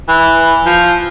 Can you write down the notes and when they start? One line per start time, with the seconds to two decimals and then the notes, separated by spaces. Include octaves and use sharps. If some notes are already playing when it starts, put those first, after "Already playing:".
0.09 E3
0.66 F3